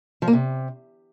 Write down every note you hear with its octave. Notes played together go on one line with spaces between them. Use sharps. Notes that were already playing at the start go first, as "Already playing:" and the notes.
F3
A#3
C3